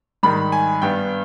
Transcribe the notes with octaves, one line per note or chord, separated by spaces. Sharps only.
G#2 D#3 G3 B5
G#5
G2 G3 B3 G5